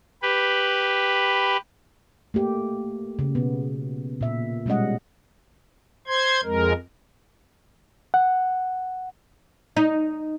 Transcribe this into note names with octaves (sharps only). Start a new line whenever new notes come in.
G4 B4
A3 A#3 G4
C#3
B2 B3
A#2 E5
B2 G3 G#3 C#4 D#5 F#5
C5 C6 G#6
F2 G#3 A#4
F#5
D#4